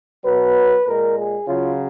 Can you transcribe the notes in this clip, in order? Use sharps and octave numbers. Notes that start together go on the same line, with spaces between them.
B2 F#3 B4
A#2 G#3 A#4
G#4
C#3 F#3 F4